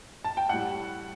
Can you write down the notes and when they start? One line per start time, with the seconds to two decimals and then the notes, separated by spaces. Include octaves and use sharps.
0.24 A5
0.37 G5
0.49 A2 G3 F#5